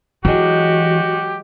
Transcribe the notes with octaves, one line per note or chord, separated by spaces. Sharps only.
E3 F#3 G#3 F#4 G4